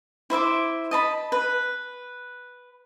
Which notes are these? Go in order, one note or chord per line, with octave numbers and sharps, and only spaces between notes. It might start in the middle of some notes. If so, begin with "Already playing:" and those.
E4 C5 E5 D6
D#5 A5 B5
B4